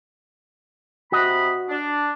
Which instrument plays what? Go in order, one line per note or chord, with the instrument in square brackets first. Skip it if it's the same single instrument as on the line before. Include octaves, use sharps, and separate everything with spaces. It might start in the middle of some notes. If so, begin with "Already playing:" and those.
[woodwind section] C3 B5 [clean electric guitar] F#4 D#5
[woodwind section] D4